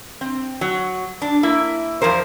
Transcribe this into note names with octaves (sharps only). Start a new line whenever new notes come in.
C4
F#3
D4
A#3 E4
E2 A#2 F3 A#4 C5